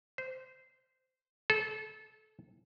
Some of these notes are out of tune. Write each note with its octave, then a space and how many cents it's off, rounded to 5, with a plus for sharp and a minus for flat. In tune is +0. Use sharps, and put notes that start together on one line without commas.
C5 -15
A4 -25